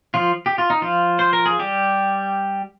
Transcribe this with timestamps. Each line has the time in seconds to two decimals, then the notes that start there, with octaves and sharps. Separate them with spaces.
0.14 F3 F4
0.46 G4
0.58 F4
0.70 D#4
0.82 F3 F4
1.19 C5
1.33 A#4
1.46 G#4
1.59 G3 G4